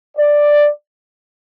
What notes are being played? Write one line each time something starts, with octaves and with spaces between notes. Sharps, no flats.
D5